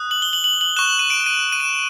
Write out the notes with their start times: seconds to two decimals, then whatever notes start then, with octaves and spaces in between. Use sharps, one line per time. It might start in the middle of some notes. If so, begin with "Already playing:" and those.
Already playing: D#6 F#6
0.11 F#7
0.22 G7
0.33 F#7
0.44 F#7
0.61 F#7
0.77 C#6 F#6 E7
0.99 D#7
1.10 D7
1.26 D#7
1.52 D#7
1.60 E7